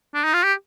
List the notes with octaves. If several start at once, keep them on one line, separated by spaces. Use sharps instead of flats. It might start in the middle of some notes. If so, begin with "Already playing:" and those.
D4
D#4
F4
G4